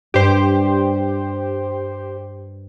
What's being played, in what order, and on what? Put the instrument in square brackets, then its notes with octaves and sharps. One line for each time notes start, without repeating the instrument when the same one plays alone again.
[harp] G2 [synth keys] G4 C5